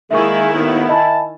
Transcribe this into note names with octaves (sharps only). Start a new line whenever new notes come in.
D#3 G#3 A#3 E4 G#4 E5 C#6
D#2 A2 B3
D#5 E5 G#5 A5 B5